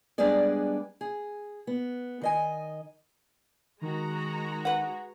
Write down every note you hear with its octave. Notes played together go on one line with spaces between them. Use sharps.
G3 G#3 B3 D4 G#4 D5
G#4
B3
D#3 D#5 G#5
D#3 G#3 F#4 A#5
B4 F#5